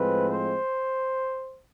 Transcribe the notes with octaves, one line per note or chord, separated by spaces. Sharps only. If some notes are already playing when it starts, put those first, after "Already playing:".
Already playing: A2 F3 G#3 C4 B4
C5